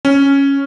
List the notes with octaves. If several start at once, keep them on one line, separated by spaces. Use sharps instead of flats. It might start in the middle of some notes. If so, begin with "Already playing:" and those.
C#4